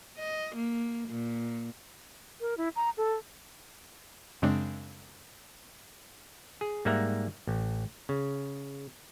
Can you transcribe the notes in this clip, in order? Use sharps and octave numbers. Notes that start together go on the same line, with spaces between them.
D#5
A#3
A#2
A#4
E4
A#5
A4
F#2 C#3 G#3 C4 D4
G#4
G#2 G3 A#3 E5 F#5 A#5
A1
C#3